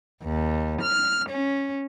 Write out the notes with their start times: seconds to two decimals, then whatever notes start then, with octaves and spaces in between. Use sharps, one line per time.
0.25 D#2
0.82 F6
1.30 C#4